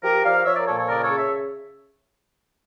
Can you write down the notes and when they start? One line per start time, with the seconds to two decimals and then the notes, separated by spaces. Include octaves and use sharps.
0.03 F3 G4 A#4
0.24 F3 D5 F5
0.45 F3 C#5 E5
0.56 A#4 D5
0.67 A#2 A4 C#5
0.78 A4 C#5
0.88 C#3 A#4 D5
1.02 A4 C#5
1.10 C#3
1.17 C#5 E5